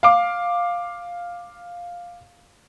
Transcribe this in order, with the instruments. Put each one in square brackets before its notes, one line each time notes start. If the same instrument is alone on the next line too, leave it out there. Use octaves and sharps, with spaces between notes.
[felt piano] F5 D6